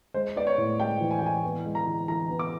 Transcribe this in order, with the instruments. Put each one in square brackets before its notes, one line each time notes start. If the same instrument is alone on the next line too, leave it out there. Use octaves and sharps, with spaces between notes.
[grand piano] G#3 [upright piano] C5
[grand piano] B3 [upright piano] D5
[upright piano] C#5
[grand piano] A2
[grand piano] G#3 [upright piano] G5
[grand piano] E3
[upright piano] G#5
G5
[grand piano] E3 [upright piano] G#5
[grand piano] B3
G#3
[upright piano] A#5
[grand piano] E3
[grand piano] E3 [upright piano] A#5
[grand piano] B3
[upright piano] D6